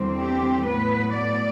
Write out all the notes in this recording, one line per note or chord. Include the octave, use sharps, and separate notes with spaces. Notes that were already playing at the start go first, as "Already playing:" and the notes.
Already playing: E2 D3 G3 C4
G4
A2 F#3 B3 B4
D5